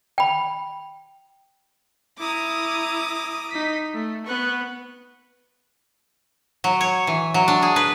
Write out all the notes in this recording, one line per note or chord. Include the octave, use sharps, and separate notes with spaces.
G5 B5
E4 A#5 D6 D#6
D#4 B6
A3
B3 C#6 F#6
F#3
C#5
E3
F#3
D4
G#4
B4